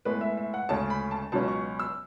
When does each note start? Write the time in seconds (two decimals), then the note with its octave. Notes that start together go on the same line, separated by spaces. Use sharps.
0.05 A2 G#3 B3 B4
0.21 E5
0.37 E5
0.54 F#5
0.69 D2 C#3 G#3 C#4 A5
0.90 B5
1.11 A5
1.32 C#2 B2 F#3 C#4 A5
1.48 C#6
1.79 E6